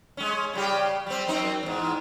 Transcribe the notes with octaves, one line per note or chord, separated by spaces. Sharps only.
G#3 C#4
C#3 G3 G4
G3 C4
F#2 C4 D#4
E2 G#2